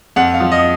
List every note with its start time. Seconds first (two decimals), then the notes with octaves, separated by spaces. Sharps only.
0.16 F2 F#5
0.34 F5
0.40 F3
0.51 D#5